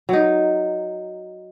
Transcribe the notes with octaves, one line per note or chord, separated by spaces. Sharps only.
F#3 D#4